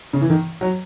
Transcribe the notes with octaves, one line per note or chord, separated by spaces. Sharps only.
C#3
E3
D#3
F#3